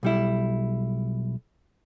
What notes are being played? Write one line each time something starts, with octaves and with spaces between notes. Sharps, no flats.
B1 G3 E4